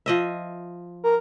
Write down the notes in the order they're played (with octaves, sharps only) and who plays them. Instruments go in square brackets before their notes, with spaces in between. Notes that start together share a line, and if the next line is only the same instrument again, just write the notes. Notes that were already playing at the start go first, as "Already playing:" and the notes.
[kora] F3 D#5 E5
[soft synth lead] A#4